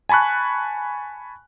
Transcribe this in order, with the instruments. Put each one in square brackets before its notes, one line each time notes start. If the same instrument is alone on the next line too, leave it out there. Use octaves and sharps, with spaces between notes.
[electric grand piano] G#5 A5 B5 C#6 F#6